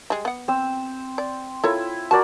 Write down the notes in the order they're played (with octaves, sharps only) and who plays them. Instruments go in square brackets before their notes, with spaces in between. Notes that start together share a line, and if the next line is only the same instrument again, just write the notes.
[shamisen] G3 G#3
B3 F#5
[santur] C4 E6
[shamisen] D5
[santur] E4 F4 [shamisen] A4 A#4 C#5
[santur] F#4 A#4 D5 [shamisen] A5